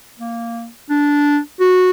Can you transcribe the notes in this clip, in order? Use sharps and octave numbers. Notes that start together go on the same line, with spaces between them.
A#3
D4
F#4